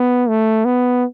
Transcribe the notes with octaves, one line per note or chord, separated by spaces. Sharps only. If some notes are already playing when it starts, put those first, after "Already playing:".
Already playing: B3
A3
B3